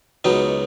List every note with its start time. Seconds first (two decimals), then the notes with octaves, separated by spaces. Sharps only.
0.24 C#2 B2 F#3 B3 D#4